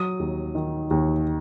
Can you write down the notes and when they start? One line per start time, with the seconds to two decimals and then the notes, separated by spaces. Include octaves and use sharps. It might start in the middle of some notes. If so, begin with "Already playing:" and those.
Already playing: F#3 D#6
0.20 D#2
0.55 D#3
0.91 D#2